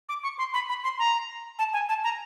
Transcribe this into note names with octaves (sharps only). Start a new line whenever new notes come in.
D6
C#6
C6
B5
B5
C6
A#5
A5
G#5
A5
A#5